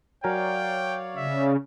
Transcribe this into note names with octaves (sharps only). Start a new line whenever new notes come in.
F#3 A#4 C#5 D5 F5 G5 G#5
C#3 E5